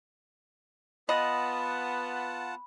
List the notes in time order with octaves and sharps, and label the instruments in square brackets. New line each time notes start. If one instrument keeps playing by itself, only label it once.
[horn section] B3 [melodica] F4 F#5 A5 [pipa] D#5 [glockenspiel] B5